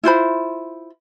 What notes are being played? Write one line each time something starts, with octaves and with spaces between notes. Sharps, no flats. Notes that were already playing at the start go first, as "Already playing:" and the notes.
E4 F4 C5 B5